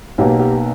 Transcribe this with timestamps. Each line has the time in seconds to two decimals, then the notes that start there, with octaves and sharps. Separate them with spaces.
0.18 B1 B2 A#3 G4
0.40 G4